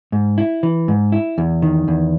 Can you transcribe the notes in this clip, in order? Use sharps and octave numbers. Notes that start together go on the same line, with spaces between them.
G#2
E4
E3
G#2
E4
E2
D#3
E2